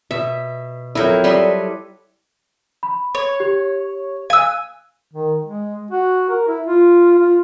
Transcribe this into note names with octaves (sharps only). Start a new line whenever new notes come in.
B2 E5
F2 F#3 E4 A#4 G5
G3 A4 B4 D#5 E5 C6
B5
C#5
G4
F5 G#5 E6 F#6
D#3
G#3
F#4
A#4
E4
F4
F4